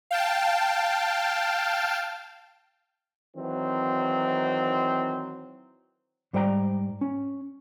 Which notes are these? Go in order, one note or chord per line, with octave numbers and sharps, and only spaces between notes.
F5 G5 A5
D#3 E3 F#3 C4
G#2 G3 C5 D5 G5 A#5
C#4